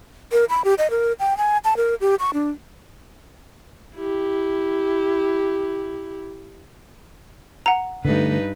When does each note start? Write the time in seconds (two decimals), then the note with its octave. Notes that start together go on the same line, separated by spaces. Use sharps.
0.32 A#4
0.50 B5
0.65 G4
0.78 D#5
0.90 A#4
1.19 G5
1.37 G#5
1.65 A5
1.77 A#4
2.01 G4
2.19 C#6
2.34 D4
3.97 E4 G4
7.66 F#5 A#5
8.05 G2 D3 A3 D#4 B4